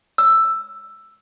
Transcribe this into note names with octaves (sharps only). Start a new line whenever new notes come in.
E6